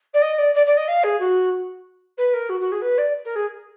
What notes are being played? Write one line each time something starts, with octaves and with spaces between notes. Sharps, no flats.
D5
D#5
D5
D5
D5
D#5
F5
G#4
F#4
B4
A#4
F#4
F#4
G#4
B4
D5
A#4
G#4